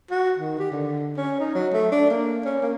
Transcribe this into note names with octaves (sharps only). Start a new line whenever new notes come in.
F#4
D#3
G4
D3
C#4
D#4
F#3
A3
D4
A#3
C#4
A#3